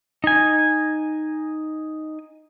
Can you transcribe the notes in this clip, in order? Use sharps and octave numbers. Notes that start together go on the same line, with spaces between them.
D#4 G#5